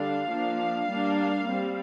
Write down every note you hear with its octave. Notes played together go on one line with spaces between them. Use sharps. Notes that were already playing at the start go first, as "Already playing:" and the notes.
Already playing: D3 G3 D4 F5
F3 A#3 D4
G3 A#3 D4
G3 C4